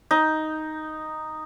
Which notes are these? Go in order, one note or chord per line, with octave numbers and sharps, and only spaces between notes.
D#4